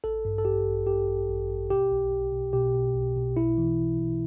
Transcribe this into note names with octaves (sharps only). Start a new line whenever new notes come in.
A1 A4
G2
A4
A1 G4
A1
G2 G4
A1
A1
A1
B2 G4
B1
B1
B2
B2 G4
B2
B1
B2
B1 E4
E3
B1
B1